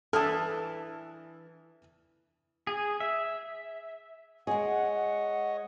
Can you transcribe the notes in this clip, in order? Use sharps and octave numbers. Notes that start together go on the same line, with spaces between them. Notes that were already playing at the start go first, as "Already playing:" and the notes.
E3 D4 A4 A5 D#6 F6
G#4
E5
G#3 G#4 C#5 D#5 F#5